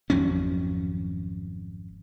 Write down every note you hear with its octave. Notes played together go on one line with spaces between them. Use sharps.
G#1 F2 F#3 C#4